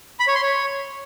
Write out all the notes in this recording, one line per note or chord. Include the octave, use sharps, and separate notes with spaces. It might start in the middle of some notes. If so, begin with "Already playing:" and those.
B5
C#5
C6
C#5